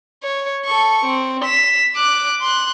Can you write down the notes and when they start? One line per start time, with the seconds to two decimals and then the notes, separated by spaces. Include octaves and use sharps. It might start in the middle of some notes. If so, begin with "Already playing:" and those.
0.23 C#5
0.65 A4 C#6
1.05 C4
1.45 B6 E7
1.96 D6 F#6
2.42 C6 F#6